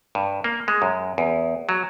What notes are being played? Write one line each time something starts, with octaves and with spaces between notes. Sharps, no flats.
G2
A#3
G#3
F#2
E2
F#3